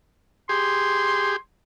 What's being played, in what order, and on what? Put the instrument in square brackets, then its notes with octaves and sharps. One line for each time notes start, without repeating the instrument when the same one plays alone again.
[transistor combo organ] G4 G#4 [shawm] C6